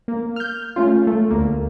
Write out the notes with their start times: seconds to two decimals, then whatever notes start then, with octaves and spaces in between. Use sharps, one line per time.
0.08 A#3
0.36 F6 G6
0.76 A3 C#4 F4
1.07 A3
1.30 D2 A#3